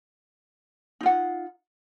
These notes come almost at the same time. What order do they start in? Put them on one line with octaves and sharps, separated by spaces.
D#4 F4 F#5